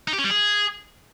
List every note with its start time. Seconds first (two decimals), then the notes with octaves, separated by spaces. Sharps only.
0.08 D#4
0.13 G4
0.19 C#4
0.24 G3
0.30 G#4